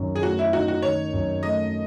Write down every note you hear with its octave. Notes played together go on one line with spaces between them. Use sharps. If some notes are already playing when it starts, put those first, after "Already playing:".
Already playing: F#2 D#3
G#4
A3 F#4
E4
D#4 F#4
F#4
D#3 C#5
F#2
A3 D#5